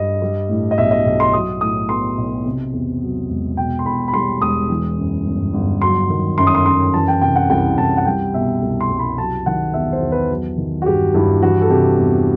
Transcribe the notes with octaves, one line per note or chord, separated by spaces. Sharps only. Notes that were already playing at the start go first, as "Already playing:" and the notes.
Already playing: G2 D#5
G3
A2
D#5
B1 E5
D#5
B1
C6
F#3 D#6
A2 D#6
B3 C6
B1
C3
E2
F#3
E1
B2 G5
C6
E2 B5
B5
G3 C6
E1 D#6
E3
F#2
G1
G1
F#3 C6
D#3
F#2 C6
D#6
C6
F#2 C6
E3 A5
G5
C3 G5
F#5
C2 G5
C2 A5
F#5
G3 G5
B2 E5
C2
C6
C2
B5
F#3 A5
D#3 F#5
E2 E5
C5
E2
B4
F#3
D#3
F#4
G2 G4
G2 E4
E3 F#4
A4
C3 G4
E2